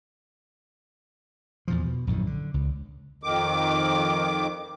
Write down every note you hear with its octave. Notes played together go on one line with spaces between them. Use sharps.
E2 A#2 F3
B2
A#1 F#2 A2 D#3
D3
C#2
F2 D#3 D6